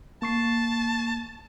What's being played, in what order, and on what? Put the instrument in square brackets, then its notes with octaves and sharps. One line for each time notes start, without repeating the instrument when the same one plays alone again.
[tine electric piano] A#3 C#6 C7 [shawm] A5